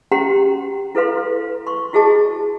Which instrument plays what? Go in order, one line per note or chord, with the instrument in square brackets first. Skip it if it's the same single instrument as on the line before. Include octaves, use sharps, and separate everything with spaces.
[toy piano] C#4 F#4 G4 F#5 A#5 C6
E4 A4 B4 F5 C6
C6 C#6
E4 F#4 G#4 D#5 A5 D6